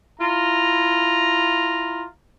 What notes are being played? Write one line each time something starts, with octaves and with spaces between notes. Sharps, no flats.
E4 F4 A#5